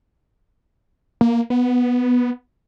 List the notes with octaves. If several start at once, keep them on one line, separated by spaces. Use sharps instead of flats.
A#3
B3